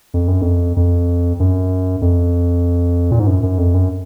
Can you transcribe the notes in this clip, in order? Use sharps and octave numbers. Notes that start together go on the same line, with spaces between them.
F2
F#2
F2
F2
F#2
F2
A#2
G#2
F#2
F#2
F2
F#2